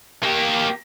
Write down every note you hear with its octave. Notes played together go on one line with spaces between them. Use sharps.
A#3 G4